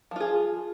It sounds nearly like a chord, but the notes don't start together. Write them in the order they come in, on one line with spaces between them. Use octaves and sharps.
F3 F4 G#4